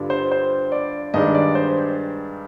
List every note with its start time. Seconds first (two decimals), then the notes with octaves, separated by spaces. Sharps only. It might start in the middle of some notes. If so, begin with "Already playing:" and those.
Already playing: G2 D3 G3 D4 F4
0.10 C5
0.32 C5
0.72 D5
1.14 G2 D#3 G#3 D4 D#5
1.35 D5
1.55 C5